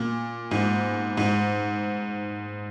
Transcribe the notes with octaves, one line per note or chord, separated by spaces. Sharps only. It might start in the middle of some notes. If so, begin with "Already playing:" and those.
Already playing: A#2
G#2
G#2